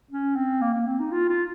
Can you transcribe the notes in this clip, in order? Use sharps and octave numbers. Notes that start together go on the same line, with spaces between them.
C#4
C4
A#3
A#3
C4
D#4
F4
F4